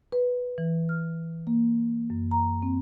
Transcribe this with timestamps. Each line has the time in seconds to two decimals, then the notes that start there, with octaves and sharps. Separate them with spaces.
0.12 B4
0.58 E3
0.89 F6
1.47 A#3
2.10 F#2
2.31 A#5
2.62 C4